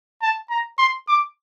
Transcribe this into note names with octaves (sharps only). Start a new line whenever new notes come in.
A5
A#5
C6
D6